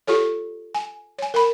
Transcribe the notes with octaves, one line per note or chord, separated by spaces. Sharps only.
F4 G4 A4 C#5
G#5
C#5 G#5
A#4 B5